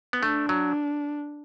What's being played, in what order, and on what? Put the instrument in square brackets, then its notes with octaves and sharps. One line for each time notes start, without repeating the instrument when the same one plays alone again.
[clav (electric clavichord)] B3
[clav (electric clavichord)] A3 [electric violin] D4
[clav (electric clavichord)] F#3